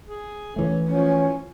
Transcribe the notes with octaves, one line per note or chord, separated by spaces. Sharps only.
G#4
E3 A3 C#4
F3 C#4